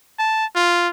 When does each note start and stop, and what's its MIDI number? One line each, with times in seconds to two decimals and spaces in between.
0.19 0.46 81
0.55 0.88 65